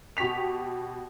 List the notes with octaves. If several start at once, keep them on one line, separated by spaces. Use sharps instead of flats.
B2 G4 C#6 B6 F7